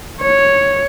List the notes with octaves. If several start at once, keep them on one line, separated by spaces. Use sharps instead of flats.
C#5